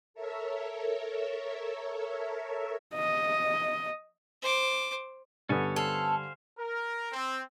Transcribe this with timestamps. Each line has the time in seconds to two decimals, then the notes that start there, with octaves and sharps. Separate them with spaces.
0.14 A4 A#4 C#5 E5
2.95 D#5
4.42 C5 D6
5.49 G2 D3 B3 C#4 A4 C#5 G#5
5.76 A4 C5 F5 G#5
6.59 A#4
7.13 C4